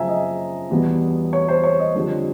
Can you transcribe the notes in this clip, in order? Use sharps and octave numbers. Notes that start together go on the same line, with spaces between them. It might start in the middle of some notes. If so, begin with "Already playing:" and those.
Already playing: F#2 C#3 F3 E5 G#5 A#5
D#5
E2 B2 G3 B3
C#5
C5
C#5
D#5
F2 D3 G3